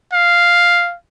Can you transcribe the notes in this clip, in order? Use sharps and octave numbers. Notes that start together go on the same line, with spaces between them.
F5